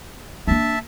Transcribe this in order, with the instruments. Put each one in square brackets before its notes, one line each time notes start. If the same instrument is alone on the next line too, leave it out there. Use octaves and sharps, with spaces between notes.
[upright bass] A#3 D4 [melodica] E5 A5